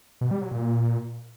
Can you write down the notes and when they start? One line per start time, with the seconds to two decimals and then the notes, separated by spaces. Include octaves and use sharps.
0.21 B2
0.31 G3
0.41 F#3
0.51 A#2